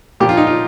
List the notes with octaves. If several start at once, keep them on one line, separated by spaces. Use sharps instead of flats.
A#2 F3 G4
F4
D#4
F4